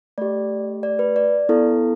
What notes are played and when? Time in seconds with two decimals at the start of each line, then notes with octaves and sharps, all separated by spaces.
0.18 A3 G4 D5
0.83 D5
0.99 B4
1.16 D5
1.49 B3 E4 A4